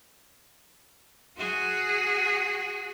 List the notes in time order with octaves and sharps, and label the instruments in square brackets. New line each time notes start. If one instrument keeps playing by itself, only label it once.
[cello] F#4 G#4